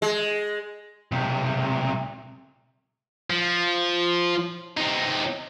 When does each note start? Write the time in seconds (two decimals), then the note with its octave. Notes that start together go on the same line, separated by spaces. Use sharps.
0.02 G#3
1.12 B1 C3
3.30 F3
4.77 C3 D#4